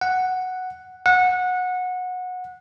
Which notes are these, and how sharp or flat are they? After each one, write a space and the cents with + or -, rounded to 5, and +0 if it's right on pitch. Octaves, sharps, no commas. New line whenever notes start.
F#5 +0
F#5 -20